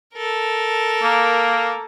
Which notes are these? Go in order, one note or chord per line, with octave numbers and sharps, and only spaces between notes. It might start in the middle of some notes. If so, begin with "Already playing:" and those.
A4 A#4
A#3